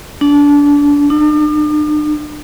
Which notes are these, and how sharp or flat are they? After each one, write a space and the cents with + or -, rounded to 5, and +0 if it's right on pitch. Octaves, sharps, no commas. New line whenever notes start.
D4 -25
D4 +45